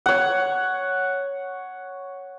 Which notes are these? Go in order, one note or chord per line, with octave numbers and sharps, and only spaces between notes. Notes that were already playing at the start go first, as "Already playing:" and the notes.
C#5 F#5